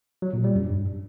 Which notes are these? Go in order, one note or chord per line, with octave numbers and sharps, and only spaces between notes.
F#3
A#2
G3
F#2
G2